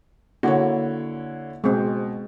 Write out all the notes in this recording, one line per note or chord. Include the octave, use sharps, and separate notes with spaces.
D3 A#3 E4 F#4 C#5
B2 G#3 C4